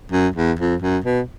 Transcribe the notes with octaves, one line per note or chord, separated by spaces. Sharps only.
F#2
E2
F2
F#2
B2